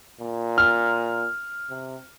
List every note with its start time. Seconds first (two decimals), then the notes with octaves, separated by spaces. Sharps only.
0.20 A#2
0.58 F6
1.70 C3